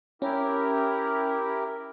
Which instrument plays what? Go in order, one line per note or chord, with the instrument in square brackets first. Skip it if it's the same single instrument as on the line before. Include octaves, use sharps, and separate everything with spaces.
[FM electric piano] C#4 [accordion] E4 G4 A#4